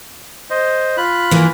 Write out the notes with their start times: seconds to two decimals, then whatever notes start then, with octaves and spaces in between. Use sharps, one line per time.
0.50 C5 D#5
0.97 F4 B5 F#6
1.31 E3 A#3